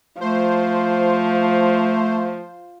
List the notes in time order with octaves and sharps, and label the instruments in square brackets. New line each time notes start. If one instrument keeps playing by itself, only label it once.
[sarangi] F3 [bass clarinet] A3 [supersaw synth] C5